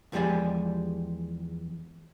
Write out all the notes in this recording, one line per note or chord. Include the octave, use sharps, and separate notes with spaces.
E2 F3 G#3 G4 D5 G#5